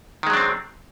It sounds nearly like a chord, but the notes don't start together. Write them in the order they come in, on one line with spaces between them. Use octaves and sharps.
D#3 G#3 F#3 D4 C4